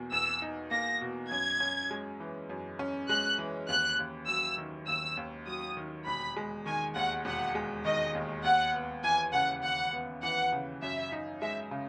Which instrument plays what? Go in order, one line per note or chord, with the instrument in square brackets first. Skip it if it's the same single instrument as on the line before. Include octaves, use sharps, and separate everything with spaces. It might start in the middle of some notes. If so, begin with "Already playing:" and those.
Already playing: [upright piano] E2 B2 A#3
[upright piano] E2 [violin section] E6
[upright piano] D#4
[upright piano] A#3 [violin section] A#6
[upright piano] B2
[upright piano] F#2 [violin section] G#6
[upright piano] C#4
G#3
E3
F#2
C#4
[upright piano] G#3 [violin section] F#6
[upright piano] E3
[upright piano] D#2 [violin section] F#6
[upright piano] D#2
[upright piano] F#3 [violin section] E6
[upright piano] D#3
[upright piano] D#2 [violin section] E6
[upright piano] D#2
[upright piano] F#3 [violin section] D#6
[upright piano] D#3
[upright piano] E1 [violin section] B5
[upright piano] G#3
[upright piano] D#3 [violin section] G#5
[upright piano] D#2 [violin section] F#5
[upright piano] E1 [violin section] F#5
[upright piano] G#3
[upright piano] D#3 [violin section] D#5
[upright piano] D#2
[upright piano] D#2 [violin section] F#5
[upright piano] B3
[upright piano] E3 [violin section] G#5
[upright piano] C#3 [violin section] F#5
[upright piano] D#2 [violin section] F#5
[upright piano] B3
[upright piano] E3 [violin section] F#5
[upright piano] C#3
[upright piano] F#2 [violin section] E5
[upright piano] D#4
[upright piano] G#3 [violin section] E5
[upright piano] C#3